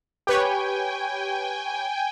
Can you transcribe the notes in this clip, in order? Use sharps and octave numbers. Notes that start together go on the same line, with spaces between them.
G4 B4 C#5 G5 G#5